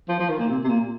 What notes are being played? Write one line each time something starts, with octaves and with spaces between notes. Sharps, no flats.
F3
F3
D#3
A#2
C3
C3
A#2